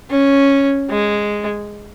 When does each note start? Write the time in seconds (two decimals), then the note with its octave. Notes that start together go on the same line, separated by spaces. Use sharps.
0.10 C#4
0.90 G#3